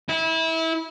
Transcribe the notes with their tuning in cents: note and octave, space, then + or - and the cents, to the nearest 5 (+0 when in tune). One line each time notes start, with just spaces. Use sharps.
E4 -25